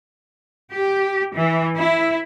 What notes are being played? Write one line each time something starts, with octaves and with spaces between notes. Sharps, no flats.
G4
E3
E4